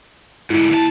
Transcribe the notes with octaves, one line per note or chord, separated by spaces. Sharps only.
G#2 D3 E4
D#2 A5